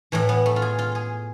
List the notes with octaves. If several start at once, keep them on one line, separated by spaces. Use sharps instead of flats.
A2 E3 A3
B3
A3
F4
G#4
F4
G#4